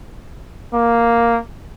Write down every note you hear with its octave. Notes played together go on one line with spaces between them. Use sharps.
A#3